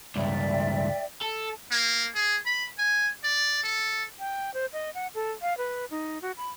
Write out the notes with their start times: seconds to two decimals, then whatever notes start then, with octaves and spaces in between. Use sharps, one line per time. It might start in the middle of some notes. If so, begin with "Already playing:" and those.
0.16 C#2 G2 D5 E5 G5
1.21 A4
1.71 A#3
2.15 G#4
2.46 B5
2.78 G#5
3.24 D5
3.64 A4
4.20 G5
4.54 C5
4.73 D#5
4.95 F#5
5.15 A4
5.42 F5
5.58 B4
5.91 D#4
6.22 F#4
6.37 B5